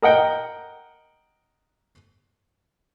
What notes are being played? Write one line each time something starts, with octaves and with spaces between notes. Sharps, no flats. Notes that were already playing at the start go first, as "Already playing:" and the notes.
A#4 D#5 F#5 G5